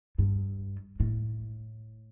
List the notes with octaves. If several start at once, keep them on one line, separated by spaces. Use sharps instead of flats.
G2
A2